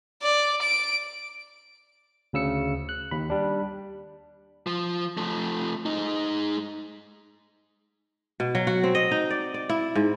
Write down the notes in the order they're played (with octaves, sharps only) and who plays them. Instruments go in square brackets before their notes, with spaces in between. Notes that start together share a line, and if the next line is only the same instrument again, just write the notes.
[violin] D5
D7
[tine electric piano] D2 C#3 E6 C#7
F#6
D#2 B5
G3 D4
[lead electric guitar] F3
F3 A3
G#3 D#4
[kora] B2
F#3
F#4
C4
D#5
D#4
D5
D5
E4
G#2